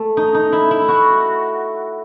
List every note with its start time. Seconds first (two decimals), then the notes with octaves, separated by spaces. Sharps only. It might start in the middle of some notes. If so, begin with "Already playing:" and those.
Already playing: A3
0.17 D#4
0.34 D#4
0.52 E4
0.71 E4
0.88 F#4